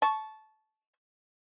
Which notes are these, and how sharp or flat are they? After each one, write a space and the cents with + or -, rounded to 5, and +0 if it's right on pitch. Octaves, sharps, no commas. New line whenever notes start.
A5 -20 C#6 +0